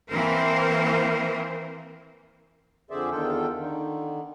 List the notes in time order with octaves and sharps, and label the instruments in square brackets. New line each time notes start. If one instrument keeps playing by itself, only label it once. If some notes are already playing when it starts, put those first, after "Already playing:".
[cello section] E3 A#3 C4 A#4 C5
[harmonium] F2 D3 G#4 C5 D5 E5
E2 D3 D#3 F4 A4 G5
D3 D#3